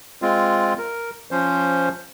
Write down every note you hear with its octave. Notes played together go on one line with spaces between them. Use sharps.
G#3 C4 F4
A#4
F3 C#4 C5